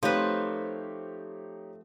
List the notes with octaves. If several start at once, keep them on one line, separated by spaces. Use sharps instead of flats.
F3 A3 C4 D#4 G4 B4 C#5